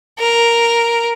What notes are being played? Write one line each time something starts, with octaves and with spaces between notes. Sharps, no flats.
A#4